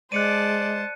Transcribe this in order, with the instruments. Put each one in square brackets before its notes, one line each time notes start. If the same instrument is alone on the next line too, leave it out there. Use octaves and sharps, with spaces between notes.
[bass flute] G#3 [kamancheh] C5 A5 [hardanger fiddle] D5 [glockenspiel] F#6 C#7 D#7